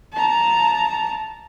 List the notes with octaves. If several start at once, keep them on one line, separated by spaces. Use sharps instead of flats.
A5 A#5